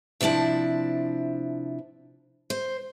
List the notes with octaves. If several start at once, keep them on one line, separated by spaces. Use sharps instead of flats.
C3 F3 D4 E4 A5
C5